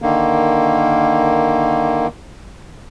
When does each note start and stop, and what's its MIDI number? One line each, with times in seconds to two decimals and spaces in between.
0.02 2.07 50
0.02 2.07 51
0.02 2.07 58